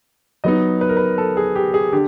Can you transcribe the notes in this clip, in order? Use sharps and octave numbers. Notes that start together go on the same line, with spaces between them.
F#3 B3 D#4 D#5
B4
A#4
B4
A4
G#4
G4
G#4
D3 G4